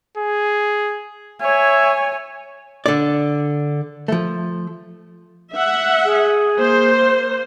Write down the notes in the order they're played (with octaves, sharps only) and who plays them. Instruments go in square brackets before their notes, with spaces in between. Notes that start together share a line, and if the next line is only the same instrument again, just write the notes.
[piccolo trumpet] G#4
[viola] C#5 G#5 [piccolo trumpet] E5
[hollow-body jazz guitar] D3 D5
F3 A3
[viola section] E5 F#5
[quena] G#4
[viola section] A#3 C5